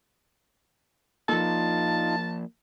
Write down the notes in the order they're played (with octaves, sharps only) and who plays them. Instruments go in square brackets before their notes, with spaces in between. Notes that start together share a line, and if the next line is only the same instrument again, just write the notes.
[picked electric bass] F3 A#3 [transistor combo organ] D#4 F4 [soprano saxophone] A5